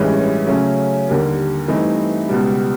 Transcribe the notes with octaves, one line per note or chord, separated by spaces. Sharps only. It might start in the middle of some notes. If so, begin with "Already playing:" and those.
Already playing: A1 G2 E3 G#3 C#4
C#3 F#3 A3 C#4
D#2 D3 G3 A#3
G2 E3 A3 C4 D#4
C#2 B2 G3